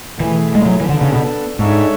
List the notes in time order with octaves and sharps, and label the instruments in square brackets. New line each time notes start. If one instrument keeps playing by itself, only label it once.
[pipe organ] B2 A3 E4 G#4 [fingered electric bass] E3
[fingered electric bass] G#3
F#3
E3
[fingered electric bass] D3 [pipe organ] B3 D4 A4
[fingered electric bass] C#3
B2
[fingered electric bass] G#2 [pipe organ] G#3 D4 A4 C#5 E5